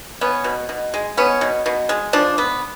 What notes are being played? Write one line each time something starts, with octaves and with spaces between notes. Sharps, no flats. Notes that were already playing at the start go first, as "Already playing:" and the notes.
B3 C#4
B2
B2
G#3
B3 C#4
B2
B2
G#3
F3 D4
B3